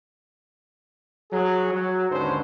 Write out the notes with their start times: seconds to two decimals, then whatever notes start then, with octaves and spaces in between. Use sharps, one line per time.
1.31 F#3 G#4
1.72 F#3
2.10 D#2 G#2 D3 C#4 B4 C5